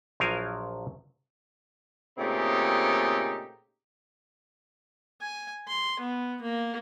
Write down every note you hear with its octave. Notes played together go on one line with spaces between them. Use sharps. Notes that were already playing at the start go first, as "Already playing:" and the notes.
A#1 F3 F#3 A#4 F5 G#5
A#2 C#3 A3 C4 D#4 G4
G#5
C6
B3
A#3